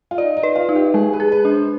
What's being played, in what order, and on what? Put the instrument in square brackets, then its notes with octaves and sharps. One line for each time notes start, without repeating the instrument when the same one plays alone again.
[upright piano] F4
[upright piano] D#4 [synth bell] D5
[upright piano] D#4
[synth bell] B4
[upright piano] F4
[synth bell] D#4
[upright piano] G4
[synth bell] G#3 [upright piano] G#4
[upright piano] B4
[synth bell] G#4
[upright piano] B4
[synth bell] D4
[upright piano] C5